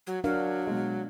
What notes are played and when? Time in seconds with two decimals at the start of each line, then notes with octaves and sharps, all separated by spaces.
0.07 F#3
0.24 F#3 D4 A#4 F5
0.67 B2 G#3